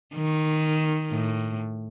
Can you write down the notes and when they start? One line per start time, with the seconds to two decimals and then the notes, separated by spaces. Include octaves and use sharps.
0.15 D#3
1.12 A2